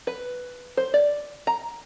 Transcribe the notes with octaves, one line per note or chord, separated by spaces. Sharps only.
B4
C5
D5
A#5